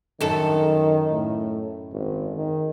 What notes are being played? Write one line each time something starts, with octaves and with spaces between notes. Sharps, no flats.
F#2 D#3 A4
A2
G#1
D#3